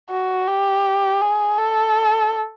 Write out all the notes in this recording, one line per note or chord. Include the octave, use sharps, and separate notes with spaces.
F#4
G4
G#4
A4